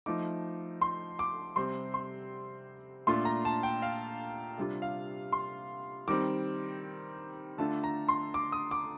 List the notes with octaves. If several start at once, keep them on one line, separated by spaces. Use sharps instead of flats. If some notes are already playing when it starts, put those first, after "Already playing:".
F3 A3 D#4 D6
C6
D6
C3 G3 C4 C6
C6
A#2 A3 D4 F4 C6
A#5
A5
G5
F5
C3 G3 D4 F4
F5
C6
D#3 G3 C4 D6
D3 A3 D4 F4 A5
A#5
C6
D6
D#6
D6